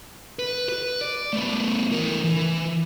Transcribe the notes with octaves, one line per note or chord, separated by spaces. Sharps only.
B4
B4
D5
A3 B3
E3 A#4
E3